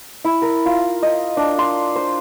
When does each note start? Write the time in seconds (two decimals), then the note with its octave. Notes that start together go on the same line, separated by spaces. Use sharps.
0.25 E4
0.42 A#4
0.66 F4
1.03 D#5
1.37 D4
1.59 C6
1.96 C5